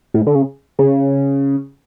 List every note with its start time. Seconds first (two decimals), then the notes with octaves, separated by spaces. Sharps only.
0.14 A2
0.27 D3
0.35 C#3
0.79 C#3